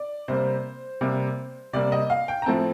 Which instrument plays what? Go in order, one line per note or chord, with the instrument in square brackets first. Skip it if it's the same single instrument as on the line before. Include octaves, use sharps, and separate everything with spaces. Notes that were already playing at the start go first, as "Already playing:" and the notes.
Already playing: [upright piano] D5
C3 G3 A#3 C5
C3 G3 A#3
C3 G3 A#3 D5
D#5
F5
G5
A#5
A2 F3 A3 C4 A5